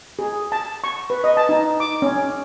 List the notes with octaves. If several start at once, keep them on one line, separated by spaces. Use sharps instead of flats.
G#4
A5
C#6
B4
D#5
A5
D#4
D6
C#4